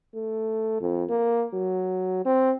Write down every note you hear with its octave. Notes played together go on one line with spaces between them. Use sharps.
A3
F2
A#3
F#3
C4